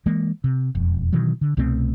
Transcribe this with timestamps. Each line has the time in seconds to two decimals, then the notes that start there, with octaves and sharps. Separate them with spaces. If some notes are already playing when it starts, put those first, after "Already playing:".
0.06 E3 G#3 A#3
0.44 C3
0.75 E1 F2
1.12 B2 D#3 E3 F#3
1.41 D3
1.57 C2 B2 A3 C4